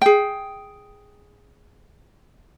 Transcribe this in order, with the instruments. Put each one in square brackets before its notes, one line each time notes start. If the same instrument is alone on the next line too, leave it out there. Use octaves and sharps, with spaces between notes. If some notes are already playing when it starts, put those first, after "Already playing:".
[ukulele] G#4 G5